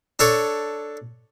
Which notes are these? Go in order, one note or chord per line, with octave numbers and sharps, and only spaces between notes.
D4 A4 C#5